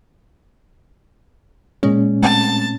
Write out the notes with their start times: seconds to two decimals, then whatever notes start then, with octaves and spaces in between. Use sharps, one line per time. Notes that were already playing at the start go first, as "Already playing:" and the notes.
1.83 A#2 G#3 C#4
2.23 A3 C4 A5